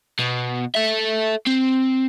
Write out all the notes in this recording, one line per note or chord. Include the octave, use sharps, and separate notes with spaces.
B2
A4 E5
C4